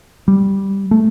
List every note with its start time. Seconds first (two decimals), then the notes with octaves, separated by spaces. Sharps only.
0.28 G3
0.91 A3